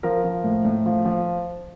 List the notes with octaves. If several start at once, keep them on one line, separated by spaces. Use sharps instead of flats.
F3 A#4
F3
A2
A2
F3
F3